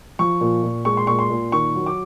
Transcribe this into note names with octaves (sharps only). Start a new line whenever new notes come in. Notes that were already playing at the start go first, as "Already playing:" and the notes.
F3 C#6
A#2
A#2
G#3 C#6
C6
A#2 C#6
C6
A#2
D#3 C#6
F#3
D6